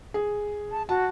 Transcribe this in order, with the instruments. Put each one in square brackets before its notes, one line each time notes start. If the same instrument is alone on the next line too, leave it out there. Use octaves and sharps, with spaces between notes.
[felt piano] G#4
[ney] A5
[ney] F#4 [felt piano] A5